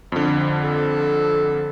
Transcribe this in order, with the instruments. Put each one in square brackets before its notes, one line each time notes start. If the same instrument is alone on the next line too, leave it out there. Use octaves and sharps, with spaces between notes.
[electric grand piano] F2 D3
[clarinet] A4